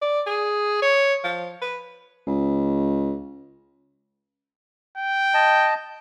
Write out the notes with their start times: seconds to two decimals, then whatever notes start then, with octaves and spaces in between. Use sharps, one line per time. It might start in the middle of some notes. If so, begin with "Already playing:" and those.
0.02 D5
0.27 G#4
0.82 C#5
1.24 F3
1.62 B4
2.27 C#2
4.97 G5
5.34 D#5 A5